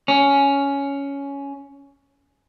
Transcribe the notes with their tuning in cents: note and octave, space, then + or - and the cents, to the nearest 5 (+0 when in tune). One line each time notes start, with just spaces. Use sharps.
C#4 +10